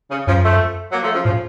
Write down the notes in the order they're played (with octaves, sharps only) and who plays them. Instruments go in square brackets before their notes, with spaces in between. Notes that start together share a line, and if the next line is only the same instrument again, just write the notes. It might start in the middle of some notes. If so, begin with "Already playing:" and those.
[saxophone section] C#3
[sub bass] F#2 [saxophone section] C#3 F3
[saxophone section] F3 A3
F#3 A#3
F3 A3
C#3 F3
[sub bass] A2 [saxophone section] C#3 F3